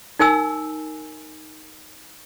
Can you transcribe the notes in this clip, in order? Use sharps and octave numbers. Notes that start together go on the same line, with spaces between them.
D#4 A#4 G#5 E6